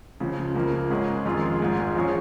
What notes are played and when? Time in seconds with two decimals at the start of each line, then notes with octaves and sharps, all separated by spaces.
0.20 C#2 C#3 F3
0.55 C#2 C#3 F3 A#3
0.90 G#2 G#3 C#4 G#4
1.26 F2 D#3 G#3 F4 G#4
1.60 G#1 G#2 G#3 F4 G#4
1.95 A#1 F3 C#4 G#4